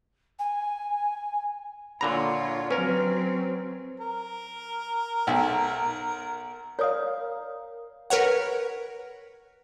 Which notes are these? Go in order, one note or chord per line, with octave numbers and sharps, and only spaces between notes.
G#5
A#2 D3 F4 C#5 A#5 B5
F#3 C4 C#4 A#4 B4
A#4
B1
A#4 C#5 D5 F5 D#6
A#4 B4 C#5 F#5